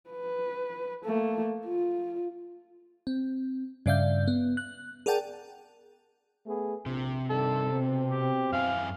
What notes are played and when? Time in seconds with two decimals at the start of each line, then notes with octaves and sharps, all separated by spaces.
0.10 B4
1.05 A3 A#3
1.66 F4
3.07 C4
3.86 G2 C#3 D5 E5 F5 G6
4.28 B3
4.57 F#6
5.06 G#4 A#4 D5 F#5 G5 A5
6.47 A3 B3 G#4
6.86 A#1 C3
7.30 G2 D#3 G3 A4
7.73 B2 C4
8.09 G4
8.52 F#2 E4 F5 G#5